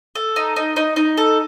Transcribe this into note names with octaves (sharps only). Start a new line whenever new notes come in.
A4
D#4
D#4
D#4
D#4
A4